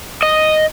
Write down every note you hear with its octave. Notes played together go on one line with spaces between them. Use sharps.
D#5